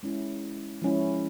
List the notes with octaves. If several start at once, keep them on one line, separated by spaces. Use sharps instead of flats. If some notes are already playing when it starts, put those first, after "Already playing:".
G#3 C#4 E4
F3 G#3 C#4 E4